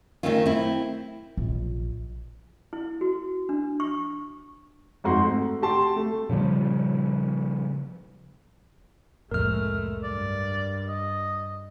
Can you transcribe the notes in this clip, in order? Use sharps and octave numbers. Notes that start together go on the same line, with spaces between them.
D#3 F#3 A3 C4 C#4 F4
C4 E4
A#1
E4
F#4
D4
C#6
F2 G#2 F#4 C6
A3
F#4 G4 A5 C6
A3
A#2 C#3 F3 G3
C2 F2 A2 G#3 A3 A#4 F6
G2 D5
D#5